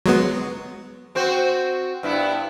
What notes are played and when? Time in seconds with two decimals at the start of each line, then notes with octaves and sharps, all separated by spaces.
0.06 F#3 G#3 B3
1.15 C4 F#4 C5
2.03 G2 B3 E4